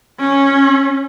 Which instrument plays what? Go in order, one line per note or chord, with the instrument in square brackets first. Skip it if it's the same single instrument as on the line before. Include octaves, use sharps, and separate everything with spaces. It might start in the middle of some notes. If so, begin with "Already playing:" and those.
[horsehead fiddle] C#4